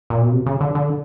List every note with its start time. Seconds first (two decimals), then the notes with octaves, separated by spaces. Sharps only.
0.10 A#2
0.21 B2
0.32 C3
0.46 C#3
0.61 D3
0.75 D3